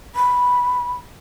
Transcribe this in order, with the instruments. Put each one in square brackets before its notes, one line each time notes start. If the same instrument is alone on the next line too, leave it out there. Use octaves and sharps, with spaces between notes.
[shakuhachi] B5